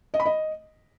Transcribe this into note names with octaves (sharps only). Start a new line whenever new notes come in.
D#5
B5
D#5